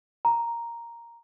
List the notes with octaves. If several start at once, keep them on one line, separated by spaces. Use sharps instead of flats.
A#5